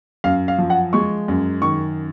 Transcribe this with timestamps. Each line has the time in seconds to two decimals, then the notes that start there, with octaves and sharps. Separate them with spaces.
0.24 F#2 F5
0.48 F5
0.58 F3
0.70 F#5
0.93 G#3 C#6
1.28 F#2
1.62 D#3 C#6